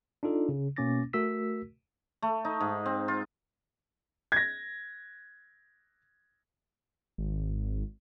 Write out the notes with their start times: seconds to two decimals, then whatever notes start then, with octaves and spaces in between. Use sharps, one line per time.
0.23 D4 D#4 F4 A4
0.49 C#3
0.76 B2 A#3 C#4 D6 A6 A#6
1.13 A3 F#4 A#4 E6 B6
2.22 A3
2.45 D#4
2.61 G#2
2.86 C4
3.08 F4
4.32 G#6 A#6
7.18 G#1